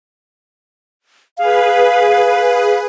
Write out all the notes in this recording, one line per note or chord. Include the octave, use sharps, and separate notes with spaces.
G#4 B4 F5